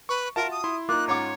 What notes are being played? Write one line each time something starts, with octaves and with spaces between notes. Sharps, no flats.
B4 C#6
F4 F#4 A#4 E5 A5
D#6
E4 C6
A#3 D#4 F4 D6 F#6
G#2 C#4 C#5 F#5 A#5 D6